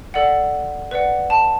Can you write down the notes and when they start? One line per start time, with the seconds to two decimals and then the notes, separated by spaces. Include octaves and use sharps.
0.14 A4 D5 F#5
0.91 B4 D5 F#5
1.30 A5